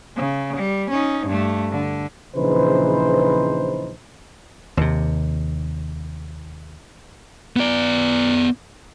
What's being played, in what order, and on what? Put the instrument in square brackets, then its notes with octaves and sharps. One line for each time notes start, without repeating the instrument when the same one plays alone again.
[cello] C#3
G3
C#4 D#4
G2 A3
D3
[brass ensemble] A#1 C#3 E3 D#4 B4 C5
[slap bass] D#2 C3
[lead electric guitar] B3 D5